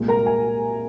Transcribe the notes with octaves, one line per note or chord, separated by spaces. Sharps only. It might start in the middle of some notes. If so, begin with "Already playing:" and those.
Already playing: C2 A#2 G#3
A#4 A#5
G#5